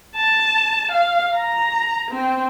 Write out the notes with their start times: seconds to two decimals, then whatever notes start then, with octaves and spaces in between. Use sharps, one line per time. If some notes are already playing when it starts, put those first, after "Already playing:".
0.16 A5
0.91 F5
1.35 A#5
2.11 C4